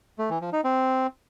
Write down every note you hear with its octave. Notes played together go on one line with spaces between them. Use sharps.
A3
E3
F3
D#4
C4